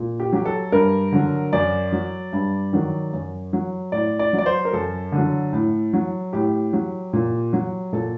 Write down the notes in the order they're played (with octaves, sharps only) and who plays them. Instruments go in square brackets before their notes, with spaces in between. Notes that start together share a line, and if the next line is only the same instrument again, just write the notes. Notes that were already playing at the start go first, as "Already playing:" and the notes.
Already playing: [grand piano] A#2
G4
F#3 G4
A4
G2 A#4
D3 F#3
F#2 D5
F#3
G2
D#3 F#3
F#2
F#3
A2 D5
D5
F#3
D5
C5
A#4
F#2 A4
D3
F#3
A2
F#3
A2 G4
F#3
A#2
F#3
A#2 A4